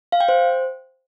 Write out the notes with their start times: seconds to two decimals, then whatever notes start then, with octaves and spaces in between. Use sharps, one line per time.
0.12 F5
0.20 G5
0.29 C5